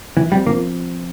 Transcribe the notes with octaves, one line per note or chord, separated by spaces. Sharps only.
E3 F3
G3 C4
F3 A#3